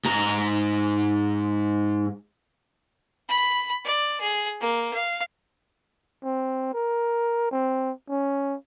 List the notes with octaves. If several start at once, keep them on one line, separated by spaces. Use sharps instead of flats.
G#2 A#5
B5
D5
G#4
A#3
F5
C4
A#4
C4
C#4